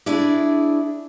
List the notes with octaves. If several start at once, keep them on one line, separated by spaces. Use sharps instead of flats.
D4 E4 G#4 D5